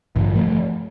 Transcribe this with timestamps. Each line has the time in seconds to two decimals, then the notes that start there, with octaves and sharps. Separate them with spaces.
0.16 A1 G2 D3
0.36 F3 A3